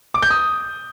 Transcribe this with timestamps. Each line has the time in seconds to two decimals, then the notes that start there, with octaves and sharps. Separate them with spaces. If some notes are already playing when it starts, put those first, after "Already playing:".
0.14 D6
0.22 G6
0.30 D#6